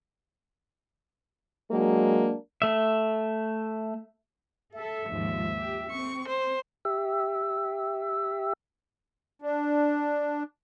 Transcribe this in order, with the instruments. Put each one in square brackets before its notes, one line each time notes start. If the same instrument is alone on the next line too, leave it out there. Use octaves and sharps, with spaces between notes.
[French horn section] F#3 G#3 A#3 D4
[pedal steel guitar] A3 E5
[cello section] A4 [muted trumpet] E5
[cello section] D#2 G#2 F3
G4
[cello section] C4 [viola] C#6
[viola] C5
[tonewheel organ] G4 E5
[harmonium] D4